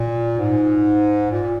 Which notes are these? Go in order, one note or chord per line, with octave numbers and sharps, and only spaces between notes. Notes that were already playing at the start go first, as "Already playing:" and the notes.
Already playing: A#2
G#2
A#2